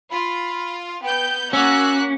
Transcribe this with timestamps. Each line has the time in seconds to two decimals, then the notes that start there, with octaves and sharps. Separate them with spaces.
0.11 F4 B5
1.02 B3 G5 G6
1.53 A#3 C#4 F#4 E6 F#6